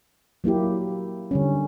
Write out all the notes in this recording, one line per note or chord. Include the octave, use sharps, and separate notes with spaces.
F#3 A#3 E4 G4
D3 G3 C#4